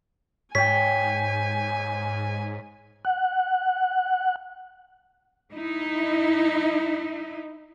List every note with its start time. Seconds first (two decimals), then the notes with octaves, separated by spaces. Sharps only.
0.55 G#2 C#5 G5 G#5 B6
3.05 F#5
5.52 D#4 E4